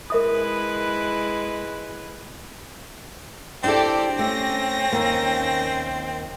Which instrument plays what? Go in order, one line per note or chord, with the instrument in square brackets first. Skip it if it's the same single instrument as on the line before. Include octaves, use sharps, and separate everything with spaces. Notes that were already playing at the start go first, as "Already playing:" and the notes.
[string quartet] G#3 E4 B4 [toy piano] A#4 E5 D#6
[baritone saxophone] C4 [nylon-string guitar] D4 E4 A4 [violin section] G4 D5
[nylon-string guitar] A3 [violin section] C#4 A#6
[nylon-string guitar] D#2 A#3